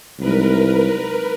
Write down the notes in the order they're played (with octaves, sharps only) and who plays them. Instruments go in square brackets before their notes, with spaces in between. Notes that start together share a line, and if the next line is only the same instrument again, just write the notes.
[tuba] C2 [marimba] F#3 G#3 D#4 [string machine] A#4 B4